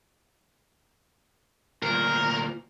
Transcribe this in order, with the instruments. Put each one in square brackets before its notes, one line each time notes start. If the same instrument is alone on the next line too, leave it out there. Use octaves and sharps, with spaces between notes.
[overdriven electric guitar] D2 A#2 [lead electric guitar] A#4